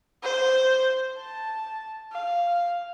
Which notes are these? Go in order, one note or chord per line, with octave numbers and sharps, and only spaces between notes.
C5
A5
F5